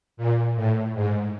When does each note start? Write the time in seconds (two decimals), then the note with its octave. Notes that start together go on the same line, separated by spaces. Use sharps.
0.17 A#2
0.56 A2
0.94 G#2